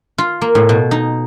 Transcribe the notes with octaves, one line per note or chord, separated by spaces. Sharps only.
F4
A#3
A2
B2
D#4